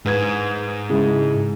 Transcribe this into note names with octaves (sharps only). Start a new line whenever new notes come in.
G#2 B4 G#6
C#3 G#3 E4